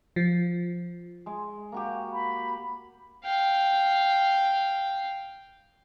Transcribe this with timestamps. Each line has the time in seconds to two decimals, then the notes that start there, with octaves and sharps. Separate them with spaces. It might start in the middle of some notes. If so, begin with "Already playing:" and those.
0.16 F3
1.26 G#3
1.72 A#3 F#4 G4
2.13 B5
3.24 F5 G5